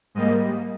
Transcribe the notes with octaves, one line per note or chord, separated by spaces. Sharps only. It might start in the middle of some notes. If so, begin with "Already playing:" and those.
G#2 G3 A#3 D#5